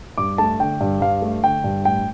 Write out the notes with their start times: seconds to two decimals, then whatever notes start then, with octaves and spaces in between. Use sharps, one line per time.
0.18 G2 D6
0.38 A3 A5
0.59 D3 G5
0.81 G2
1.01 G2 F5
1.22 A3
1.43 D3 G5
1.64 G2
1.85 A2 G5